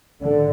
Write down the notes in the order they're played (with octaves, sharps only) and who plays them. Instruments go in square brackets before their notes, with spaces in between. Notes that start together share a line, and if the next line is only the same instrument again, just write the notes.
[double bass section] A2 D3